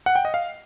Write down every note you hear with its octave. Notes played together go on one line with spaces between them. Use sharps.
F#5
G5
D#5
F5